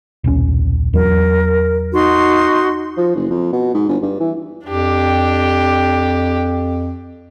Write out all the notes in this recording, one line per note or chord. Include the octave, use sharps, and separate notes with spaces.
D#1 B1 C#4
E2 F#3 A#4
D#4 F#4 C6
F3
F#1
F2
B2
G#2
G1
G2
E3
F2 D4 G4